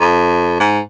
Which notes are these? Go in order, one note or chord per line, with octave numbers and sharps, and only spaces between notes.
F2
G#2